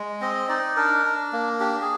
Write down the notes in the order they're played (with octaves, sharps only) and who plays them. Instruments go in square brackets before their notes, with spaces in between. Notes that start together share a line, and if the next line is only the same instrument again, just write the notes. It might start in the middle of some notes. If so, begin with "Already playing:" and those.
Already playing: [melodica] G#3
C4 D#5
D#4 D5
D4 A#4
D4
A#3
D4 G4
G#4